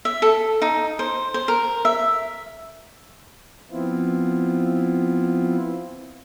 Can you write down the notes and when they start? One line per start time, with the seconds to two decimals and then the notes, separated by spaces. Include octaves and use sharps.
0.05 E5
0.22 A4
0.62 D#4
0.99 C5
1.34 C5
1.48 A#4
1.85 E5
3.71 F3 B3 C4 E4 F4